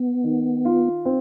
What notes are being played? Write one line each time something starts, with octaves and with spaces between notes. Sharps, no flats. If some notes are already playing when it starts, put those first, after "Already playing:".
Already playing: B3
D#3
F4
C4